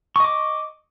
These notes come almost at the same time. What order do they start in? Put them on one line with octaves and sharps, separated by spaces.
C#6 D#5 D6